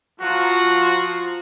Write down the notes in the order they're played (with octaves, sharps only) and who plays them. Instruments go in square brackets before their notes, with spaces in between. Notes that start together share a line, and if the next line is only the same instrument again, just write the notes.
[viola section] F3 F4 A#5 [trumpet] F#4